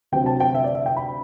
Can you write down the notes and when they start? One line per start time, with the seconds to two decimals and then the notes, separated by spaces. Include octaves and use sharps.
0.12 D2 C3 F#3 C4 G5
0.26 A5
0.40 G5
0.55 E5
0.64 D5
0.75 E5
0.86 G5
0.97 B5